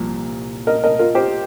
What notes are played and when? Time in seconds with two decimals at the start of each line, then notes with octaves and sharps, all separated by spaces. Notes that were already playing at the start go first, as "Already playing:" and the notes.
Already playing: C2 A#2 F3
0.67 A#4 D#5
0.84 A#4 D#5
0.99 F4 A#4
1.15 G4 C5